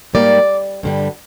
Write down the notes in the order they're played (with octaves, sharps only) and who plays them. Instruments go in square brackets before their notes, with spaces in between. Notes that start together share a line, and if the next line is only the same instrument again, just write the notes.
[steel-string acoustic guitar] G#2 G3 A#3 D5
G2 D3 G3